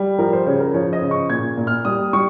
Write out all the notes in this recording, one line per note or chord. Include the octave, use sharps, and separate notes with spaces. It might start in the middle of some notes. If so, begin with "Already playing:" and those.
Already playing: G3
F3 A#4
C5
C#3 C#5
A#4
F3 C#5
D#5
C#3
C#6
A#2 G#6
A#2
F6
G3 D#6
G3 C#6